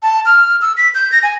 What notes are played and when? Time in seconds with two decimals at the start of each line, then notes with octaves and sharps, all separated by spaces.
0.03 A5
0.26 F6
0.62 E6
0.77 B6
0.95 G6
1.12 A#6
1.23 G#5